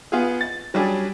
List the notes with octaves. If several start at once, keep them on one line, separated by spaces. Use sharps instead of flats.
B3 F4 G#4
A6
F#3 G3 C#4 D4 G#4